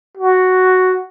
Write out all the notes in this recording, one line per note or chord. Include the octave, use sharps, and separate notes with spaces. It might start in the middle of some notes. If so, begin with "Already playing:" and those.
F#4